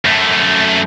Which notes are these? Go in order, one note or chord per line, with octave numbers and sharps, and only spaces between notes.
F#2 A3